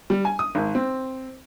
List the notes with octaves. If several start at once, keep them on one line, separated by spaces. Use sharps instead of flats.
G3
G#5
D#6
G#1
C4